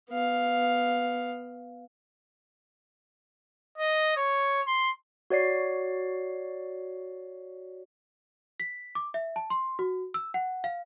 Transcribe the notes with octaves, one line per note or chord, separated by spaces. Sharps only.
B3 F5
D#5
C#5
C6
F#4 C#5 D5 C7
B6
D6
E5
A5
C6
F#4
E6
F#5
F5